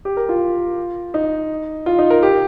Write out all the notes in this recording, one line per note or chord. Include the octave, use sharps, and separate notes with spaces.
G4
A#4
F4
D#4
F4
D#4
A#4
G4